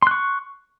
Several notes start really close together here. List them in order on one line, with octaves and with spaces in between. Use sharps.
C6 F#6 C#6